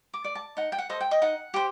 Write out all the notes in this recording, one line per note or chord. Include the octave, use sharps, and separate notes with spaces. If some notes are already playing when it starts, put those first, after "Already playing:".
D6
D5
A5
D#4 F#5
G5
F#5
A4 C5 D#5
G5
D#5
D#4 F#5
G4 C5